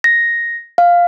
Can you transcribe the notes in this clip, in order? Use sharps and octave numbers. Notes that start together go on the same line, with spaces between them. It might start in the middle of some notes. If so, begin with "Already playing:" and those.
A#6
F5